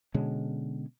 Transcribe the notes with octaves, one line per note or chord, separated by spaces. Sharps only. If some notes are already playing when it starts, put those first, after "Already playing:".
B2 D3 G#3 C#4